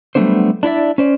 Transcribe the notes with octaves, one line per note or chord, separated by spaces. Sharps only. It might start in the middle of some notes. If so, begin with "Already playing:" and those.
F#3 G3 A3 B3 D4 C5
D4 E4 D5 E5
C#4 C5 D5